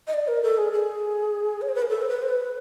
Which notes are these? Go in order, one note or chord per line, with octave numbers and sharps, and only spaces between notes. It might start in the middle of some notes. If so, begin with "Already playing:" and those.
D#5
D5
A#4
A4
G#4
G#4
C#5
C5
B4
A#4
A4
C5
B4
C5
B4